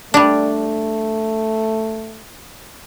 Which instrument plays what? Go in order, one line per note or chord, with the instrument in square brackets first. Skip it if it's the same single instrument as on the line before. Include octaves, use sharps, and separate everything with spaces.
[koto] G3 D4 [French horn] A3